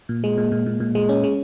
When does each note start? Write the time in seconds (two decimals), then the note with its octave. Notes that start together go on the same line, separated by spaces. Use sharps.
0.09 A#2
0.24 G#3
0.38 A#2
0.52 A#2
0.66 A#2
0.80 A#2
0.95 G#3
1.09 C#4
1.24 G#3